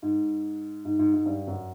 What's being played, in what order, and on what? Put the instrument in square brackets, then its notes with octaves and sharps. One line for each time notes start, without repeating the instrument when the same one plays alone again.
[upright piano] G#2
G#2
G#2
G#2
G2
F#2